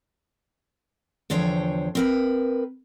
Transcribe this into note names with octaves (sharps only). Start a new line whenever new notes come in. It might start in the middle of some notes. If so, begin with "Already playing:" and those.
E2 D3 F3 C5 C#5 G5
C4 A#4 B4